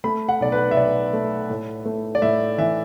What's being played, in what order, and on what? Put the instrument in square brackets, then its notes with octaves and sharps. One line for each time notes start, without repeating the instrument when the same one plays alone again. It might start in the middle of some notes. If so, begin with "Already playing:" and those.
[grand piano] A3 B5
F#5
B1 D5
B4
E5
B1 D5
A3
A2
A3
D5
A2 E5
E3 E5